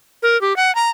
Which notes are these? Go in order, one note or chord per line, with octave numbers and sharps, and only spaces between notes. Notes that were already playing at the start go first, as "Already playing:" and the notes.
A#4
G4
F#5
A#5